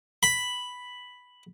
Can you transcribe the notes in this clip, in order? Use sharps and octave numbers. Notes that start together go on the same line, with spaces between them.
B5